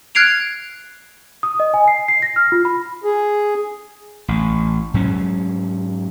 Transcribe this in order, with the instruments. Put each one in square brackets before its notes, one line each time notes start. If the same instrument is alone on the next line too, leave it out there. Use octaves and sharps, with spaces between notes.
[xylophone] F6 F#6 G#6 C7 D7 F7
[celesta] D#6
D#5
G#5
C7
C7
A#6
F6
F4
B5
[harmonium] G#4
[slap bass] A1
G#2 F#3 C#4